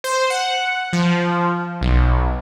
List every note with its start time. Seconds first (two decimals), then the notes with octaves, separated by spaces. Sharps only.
0.04 C5
0.30 F#5
0.93 F3
1.81 B1